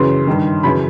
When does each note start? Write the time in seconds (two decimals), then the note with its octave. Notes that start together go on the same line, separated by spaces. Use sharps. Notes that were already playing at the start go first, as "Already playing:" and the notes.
Already playing: F#2 C#3 E3 C6
0.27 G2 D#3
0.63 F#2 C#3 E3 B5